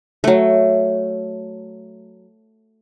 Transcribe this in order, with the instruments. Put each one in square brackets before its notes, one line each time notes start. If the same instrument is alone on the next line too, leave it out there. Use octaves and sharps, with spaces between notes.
[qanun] F#3 A3